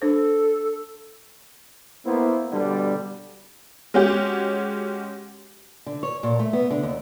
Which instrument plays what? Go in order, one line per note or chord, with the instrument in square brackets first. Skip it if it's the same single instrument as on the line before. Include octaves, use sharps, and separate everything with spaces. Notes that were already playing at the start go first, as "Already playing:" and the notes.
[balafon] D4 C5 [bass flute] A4
[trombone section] A#3 B3 E4 C5
B2 D3 G3
[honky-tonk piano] G#3 C#4 F#4 G4
[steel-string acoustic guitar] D3
C#5
A#2
A3
B3
D3
D#2